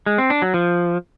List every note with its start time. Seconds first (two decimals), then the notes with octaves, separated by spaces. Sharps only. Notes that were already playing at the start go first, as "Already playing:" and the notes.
0.06 G#3
0.18 C4
0.30 D4
0.42 F#3
0.54 F3